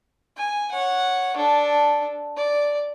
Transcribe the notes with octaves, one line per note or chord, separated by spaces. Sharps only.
G#5
C#5 F#5
D4 A4
D5